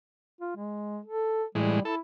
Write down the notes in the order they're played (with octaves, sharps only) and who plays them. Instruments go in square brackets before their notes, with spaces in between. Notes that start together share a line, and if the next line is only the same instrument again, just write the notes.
[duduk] F4
G#3
A4
[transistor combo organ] A2 E3 G#3 [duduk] G3
[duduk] E4 [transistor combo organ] A4